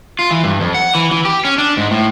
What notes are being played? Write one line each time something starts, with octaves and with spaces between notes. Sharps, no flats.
F4
E3
G2
F2
F#5
E3
E3
G4
C#4
D4
G#2
A2